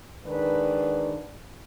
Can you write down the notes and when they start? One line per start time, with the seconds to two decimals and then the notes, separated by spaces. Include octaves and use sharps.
0.24 G#2 D#3 D4 B4